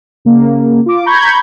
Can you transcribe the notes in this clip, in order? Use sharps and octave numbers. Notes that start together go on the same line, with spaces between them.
C#3 A#3
F4 D6
A#5 B5 C#6 G6 G#6